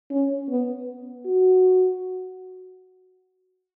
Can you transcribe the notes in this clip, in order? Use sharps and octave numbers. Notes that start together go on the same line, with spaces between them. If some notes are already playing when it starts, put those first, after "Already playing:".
C#4
B3
F#4